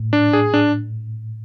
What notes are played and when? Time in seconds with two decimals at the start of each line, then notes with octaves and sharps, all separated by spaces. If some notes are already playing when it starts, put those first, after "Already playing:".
Already playing: A2
0.13 D4
0.33 G#4
0.54 D4